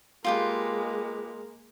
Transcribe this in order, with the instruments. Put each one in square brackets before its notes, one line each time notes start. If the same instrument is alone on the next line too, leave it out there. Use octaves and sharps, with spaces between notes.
[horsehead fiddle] G#3 A#3 [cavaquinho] F4 G4 B4